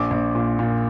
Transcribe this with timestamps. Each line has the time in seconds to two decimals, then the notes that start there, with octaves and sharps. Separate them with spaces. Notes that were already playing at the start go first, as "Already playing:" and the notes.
Already playing: A#1 D6
0.11 A#1
0.35 A#2
0.59 A#2